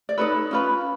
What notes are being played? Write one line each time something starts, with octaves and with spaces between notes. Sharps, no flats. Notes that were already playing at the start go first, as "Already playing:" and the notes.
D5
D#4 F#4 A4 B4 C#5
C#4 F4 G#4 B4